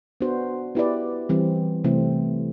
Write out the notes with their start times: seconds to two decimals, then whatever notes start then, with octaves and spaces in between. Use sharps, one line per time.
0.21 B3 D4 F#4 C5
0.75 B3 E4 G4 B4 D5
1.29 E3 G3 C4
1.84 C3 E3 A3 C4